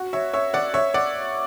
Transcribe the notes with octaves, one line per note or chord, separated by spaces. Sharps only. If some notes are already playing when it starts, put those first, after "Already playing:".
Already playing: F#4
C#5 E5
C#5 E5
D5 F#5
C#5 E5
D5 F#5